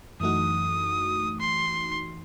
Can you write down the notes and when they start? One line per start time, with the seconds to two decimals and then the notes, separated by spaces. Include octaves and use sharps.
0.20 F#2 E3 A3 D#4 F#4 D#6
1.40 C6